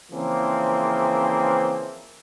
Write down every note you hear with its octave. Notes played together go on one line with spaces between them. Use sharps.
C#3 E3 F3 A#3 C4